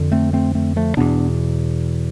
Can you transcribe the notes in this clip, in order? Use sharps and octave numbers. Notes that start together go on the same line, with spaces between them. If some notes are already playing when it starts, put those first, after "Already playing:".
Already playing: F2 D3
A3 C4
A3 C4
A3 C4
F3 A3
E2 B2 B3 D4